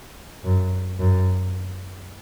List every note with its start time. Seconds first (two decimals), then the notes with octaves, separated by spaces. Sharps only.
0.45 F#2
1.00 F#2